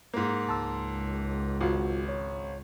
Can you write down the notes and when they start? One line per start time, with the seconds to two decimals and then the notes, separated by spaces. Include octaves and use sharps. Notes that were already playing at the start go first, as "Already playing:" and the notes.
0.14 G#2 A#3
0.49 C#2 A5 C6 E6
1.61 G#1 F4 F#4
2.09 C#5